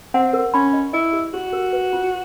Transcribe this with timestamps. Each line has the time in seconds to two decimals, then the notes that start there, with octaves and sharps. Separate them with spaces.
0.14 C4 F#5
0.33 A#4
0.54 C#4 B5
0.73 D#5
0.93 E4 D#5
1.13 G4
1.33 F#4 G4
1.53 A#4
1.73 B4
1.93 F4